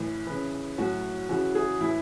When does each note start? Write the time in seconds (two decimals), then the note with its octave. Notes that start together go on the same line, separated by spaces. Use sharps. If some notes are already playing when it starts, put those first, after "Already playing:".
Already playing: A2 E3 B4
0.27 C#3 E3 B4
0.78 A2 F#3 F#4
1.29 C#3 E3 F#4
1.55 G#4
1.80 A2 E3 E4